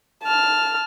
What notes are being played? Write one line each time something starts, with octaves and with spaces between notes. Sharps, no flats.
A5 F6